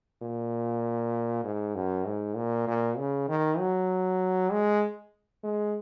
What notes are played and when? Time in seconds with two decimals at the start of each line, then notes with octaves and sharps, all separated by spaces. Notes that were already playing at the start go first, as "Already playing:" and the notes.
0.22 A#2
1.44 G#2
1.75 F#2
2.07 G#2
2.36 A#2
2.67 A#2
2.98 C#3
3.28 D#3
3.59 F#3
4.52 G#3
5.44 G#3